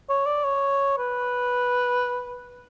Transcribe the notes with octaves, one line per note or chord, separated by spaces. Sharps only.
C#5
D5
C#5
B4